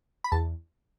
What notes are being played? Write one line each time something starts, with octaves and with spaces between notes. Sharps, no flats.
B5
E2 A5